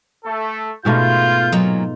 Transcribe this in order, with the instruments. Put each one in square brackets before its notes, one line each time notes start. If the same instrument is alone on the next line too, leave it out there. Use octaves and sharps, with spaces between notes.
[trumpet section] A3 A4
[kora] G#2 B2 A3 [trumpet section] F4 [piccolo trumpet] G6
[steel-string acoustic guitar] A#2 F#3 [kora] D#4 F4